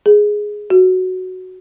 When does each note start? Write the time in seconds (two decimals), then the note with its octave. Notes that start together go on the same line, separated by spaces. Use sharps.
0.06 G#4
0.70 F#4